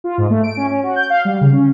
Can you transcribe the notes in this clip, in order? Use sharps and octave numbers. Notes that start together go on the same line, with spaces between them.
F4
G#2
A3
D7
C#4
C#4
F#4
G6
F5
G3
C#3
C#4